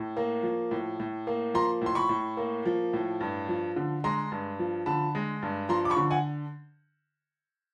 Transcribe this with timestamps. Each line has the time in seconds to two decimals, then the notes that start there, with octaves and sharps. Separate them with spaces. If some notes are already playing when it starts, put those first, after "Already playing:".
Already playing: A2
0.17 A#3
0.43 F3
0.71 A2
1.00 A2
1.27 A#3
1.54 F3 A#5 C6
1.81 A2 C6
1.95 B5 C#6
2.09 A2
2.37 A#3
2.65 F3
2.93 A2
3.21 G2
3.49 F3
3.76 D3
4.04 G#3 A#5 C6
4.32 G2
4.59 F3
4.86 D3 A5 B5
5.15 G#3
5.43 G2
5.69 F3 A#5 C6
5.85 D6
5.90 B5 C#6
5.97 D3
6.11 F#5 G#5